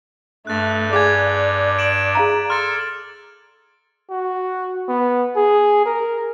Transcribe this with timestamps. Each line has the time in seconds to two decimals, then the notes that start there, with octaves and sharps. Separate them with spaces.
0.47 G2 A3 F#6 A6
0.93 G#4 D5 F5 G#5 D6 G#6
1.78 D7 E7 F#7
2.15 G#4 F5 A#5
2.50 A4 C6 F6 A6
4.10 F#4
4.88 B3
5.36 G#4
5.86 A#4